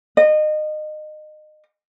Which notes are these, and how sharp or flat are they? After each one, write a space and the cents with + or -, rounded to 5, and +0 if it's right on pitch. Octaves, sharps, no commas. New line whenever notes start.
D#5 -25